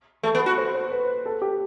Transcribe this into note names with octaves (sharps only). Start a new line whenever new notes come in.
A3 A4
B3
A4
F#4
C5
C5
B4
A4
G4